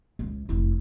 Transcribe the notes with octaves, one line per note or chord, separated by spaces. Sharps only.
C#2
F1 E4